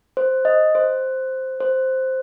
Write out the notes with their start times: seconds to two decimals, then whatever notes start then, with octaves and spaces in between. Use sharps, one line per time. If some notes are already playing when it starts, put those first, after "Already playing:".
0.17 C5
0.45 D#5
0.75 C5
1.60 C5